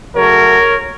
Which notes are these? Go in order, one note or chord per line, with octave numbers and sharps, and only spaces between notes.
C#3 F#3 A3 A#4 C#5